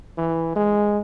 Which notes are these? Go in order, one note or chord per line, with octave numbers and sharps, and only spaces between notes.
E3
G#3